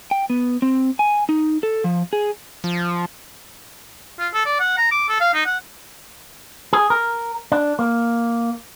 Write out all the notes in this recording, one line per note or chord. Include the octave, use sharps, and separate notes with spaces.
G5
B3
C4
G#5
D#4
A4
F3
G#4
F3
F4
A4
D5
F#5
A#5
D6
A4
F5
D#4
F#5
G#4
A#4
D4
A#3